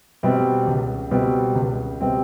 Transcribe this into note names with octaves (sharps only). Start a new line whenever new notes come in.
B2 G3 C4
C#2
B2 G3 C4
C#2
B2 G3 C4